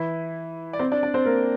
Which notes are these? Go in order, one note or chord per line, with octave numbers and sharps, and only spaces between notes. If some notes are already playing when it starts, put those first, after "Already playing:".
Already playing: E3 E4
D5
C4 C5
D4 D5
D4 D5
C4 C5
A#3 A#4